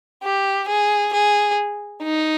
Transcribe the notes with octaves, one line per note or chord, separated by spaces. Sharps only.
G4
G#4
G#4
D#4